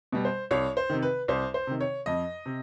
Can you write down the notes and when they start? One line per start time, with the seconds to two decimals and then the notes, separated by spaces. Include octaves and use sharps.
0.12 B2 G3
0.25 C5
0.51 C2 C#5
0.77 C5
0.90 C3 D#3
1.02 B4
1.28 C2 C5
1.54 C5
1.67 C3 D#3
1.81 C#5
2.06 F2 D#5
2.46 C3